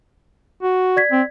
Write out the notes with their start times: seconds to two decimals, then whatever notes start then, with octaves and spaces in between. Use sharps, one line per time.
0.63 F#4
0.97 D5 G#6 B6
1.11 C4